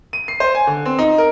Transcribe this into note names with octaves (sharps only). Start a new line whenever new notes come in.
D#7
C7
C5
G#5
D3
C4
D#4
A#4